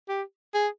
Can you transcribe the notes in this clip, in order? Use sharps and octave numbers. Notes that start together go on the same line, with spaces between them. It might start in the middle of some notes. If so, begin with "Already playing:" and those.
G4
G#4